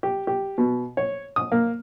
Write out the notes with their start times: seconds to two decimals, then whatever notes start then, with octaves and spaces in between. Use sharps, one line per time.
0.03 G4
0.27 G4
0.58 B2
0.97 C#5
1.36 D#6
1.52 A#3